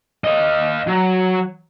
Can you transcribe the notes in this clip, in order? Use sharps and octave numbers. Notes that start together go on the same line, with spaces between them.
D#5 F5
F#3